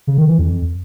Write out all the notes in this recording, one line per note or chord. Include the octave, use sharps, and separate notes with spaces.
C#3
D#3
E3
F2